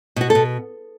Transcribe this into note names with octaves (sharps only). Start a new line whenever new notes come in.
B2 F#4
A4
B2